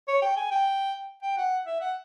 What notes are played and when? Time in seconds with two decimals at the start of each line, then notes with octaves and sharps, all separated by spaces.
0.08 C#5
0.22 G5
0.37 G#5
0.52 G5
1.23 G5
1.37 F#5
1.66 E5
1.81 F#5